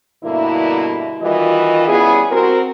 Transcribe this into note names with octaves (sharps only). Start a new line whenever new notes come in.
G2 B2 D3 A#3 E4
D#3 E3 G3 F4 F#4 D#5
G3 B3 C#4 E4 G#4
C4 F#4 A#4